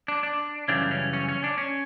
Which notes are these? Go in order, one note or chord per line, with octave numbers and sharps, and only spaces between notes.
D4
D4
F#2 C#3 E3 G3 C#4 D4
C#4
C#4
C#4
D4
C#4